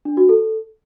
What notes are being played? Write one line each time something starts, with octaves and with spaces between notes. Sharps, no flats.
D4
F#4
A4